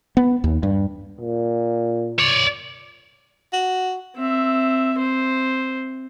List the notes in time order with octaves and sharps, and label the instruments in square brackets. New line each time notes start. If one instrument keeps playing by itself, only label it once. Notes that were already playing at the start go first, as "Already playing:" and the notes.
[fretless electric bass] B3
D#2
G2
[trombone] A#2
[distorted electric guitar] C#5 D5
[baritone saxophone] F#4
[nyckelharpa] C4 E5
C4 C5